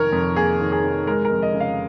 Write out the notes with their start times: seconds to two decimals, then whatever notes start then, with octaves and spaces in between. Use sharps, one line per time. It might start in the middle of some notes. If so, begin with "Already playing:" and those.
Already playing: F1 D#3 A#4 C#5
0.12 F2
0.36 A#3 G#4
0.60 D#3
0.72 G#4
0.84 F1
1.07 G#3 A#4
1.25 A#4
1.31 F2
1.42 D#5
1.54 C#3
1.60 F5